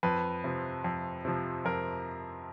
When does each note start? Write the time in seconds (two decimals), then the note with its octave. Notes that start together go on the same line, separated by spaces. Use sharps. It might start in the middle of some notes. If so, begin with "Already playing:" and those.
0.03 F2 B4
0.44 C3 F3
0.84 F2
1.25 C3 F3
1.65 F2 A#4